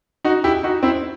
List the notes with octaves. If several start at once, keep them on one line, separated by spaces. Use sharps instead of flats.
D#4 F#4
E4 G4
D#4 F#4
C4 E4